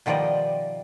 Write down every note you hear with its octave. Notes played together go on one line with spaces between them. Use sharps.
B2 D#3 F3 G3 D5 D#5